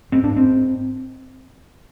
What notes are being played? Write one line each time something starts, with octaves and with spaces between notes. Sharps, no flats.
G#2 C4
D4
C4